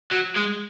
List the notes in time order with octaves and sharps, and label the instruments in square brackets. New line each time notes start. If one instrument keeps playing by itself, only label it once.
[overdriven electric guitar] F#3
G#3